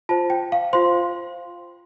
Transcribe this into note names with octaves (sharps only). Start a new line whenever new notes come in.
F4 C5 A5
G5
F5
F4 C5 C6